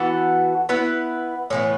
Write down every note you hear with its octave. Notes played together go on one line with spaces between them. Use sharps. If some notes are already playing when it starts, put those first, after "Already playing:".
Already playing: E3 B3 F#4 A4
B3 E4 B4
A2 E3 B3